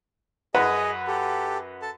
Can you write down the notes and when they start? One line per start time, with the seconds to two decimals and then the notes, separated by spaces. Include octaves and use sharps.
0.55 F#2 F#4 G#4 B4 D#5
1.07 G4 A4
1.82 A4 A5